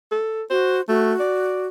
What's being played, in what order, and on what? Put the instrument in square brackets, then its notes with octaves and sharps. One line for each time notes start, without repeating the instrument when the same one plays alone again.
[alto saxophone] A4
[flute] F#4 [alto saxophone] C5
[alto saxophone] A3 [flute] F#4
[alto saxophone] D5